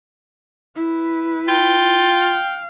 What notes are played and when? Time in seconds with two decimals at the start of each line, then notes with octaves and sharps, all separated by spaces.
0.76 E4 B4
1.48 F4 G5
2.09 F5